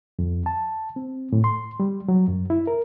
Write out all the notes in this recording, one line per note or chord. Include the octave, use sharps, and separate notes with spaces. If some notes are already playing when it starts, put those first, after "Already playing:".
F2
A5
C4
A2
C6
G3
F#3
F#2
E4
A#4